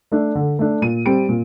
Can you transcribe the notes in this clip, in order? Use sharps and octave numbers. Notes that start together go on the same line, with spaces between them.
A3 D4
D3
A3 D4
A#2 D#7
G3 C4 D7
A#2